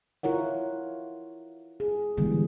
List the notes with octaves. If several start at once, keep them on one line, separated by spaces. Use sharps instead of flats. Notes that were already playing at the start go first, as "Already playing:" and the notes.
E4 F4 A#4 C#5 F#5
G#4
D3 E3 G3 G#3 B3